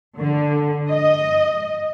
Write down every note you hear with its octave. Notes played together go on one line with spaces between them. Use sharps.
D3
D#5